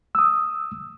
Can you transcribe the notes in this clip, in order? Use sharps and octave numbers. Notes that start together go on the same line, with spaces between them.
D#6 E6